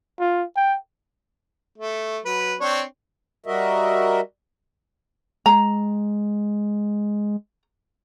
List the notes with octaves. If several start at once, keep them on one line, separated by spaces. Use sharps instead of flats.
F4
G5
A3
F#3 B4
C4 D4 C#5
G3 F#4 A#4 D#5 E5
G#3 A#5